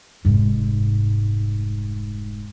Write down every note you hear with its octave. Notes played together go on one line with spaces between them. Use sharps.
F1 G#2